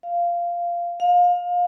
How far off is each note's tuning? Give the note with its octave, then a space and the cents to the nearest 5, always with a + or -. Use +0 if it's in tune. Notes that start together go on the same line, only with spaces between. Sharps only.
F5 -10
F5 +25